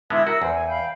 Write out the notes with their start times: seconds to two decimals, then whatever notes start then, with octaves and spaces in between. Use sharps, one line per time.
0.10 D3 G#3 B3 E4 E5 D#6
0.27 F#4 A#4 E6
0.42 E2 C5
0.53 G#5
0.67 F5 G5 B5